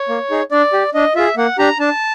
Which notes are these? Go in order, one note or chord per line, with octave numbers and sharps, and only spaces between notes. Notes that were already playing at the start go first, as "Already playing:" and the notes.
Already playing: C#5
A#3
D#4 G#4
D4 D5
G4
D4 D#5
F4 G#4 E5
A#3 F#5
D4 G4 A#5
D4 A5